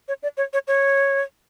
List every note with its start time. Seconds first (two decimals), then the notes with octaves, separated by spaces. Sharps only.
0.08 C#5
0.23 D5
0.37 C#5
0.53 C#5
0.68 C#5